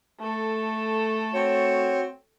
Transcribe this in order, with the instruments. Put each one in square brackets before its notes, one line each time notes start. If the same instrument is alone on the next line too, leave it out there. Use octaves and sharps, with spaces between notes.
[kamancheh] A3 A4
[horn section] C4 F#4 C#5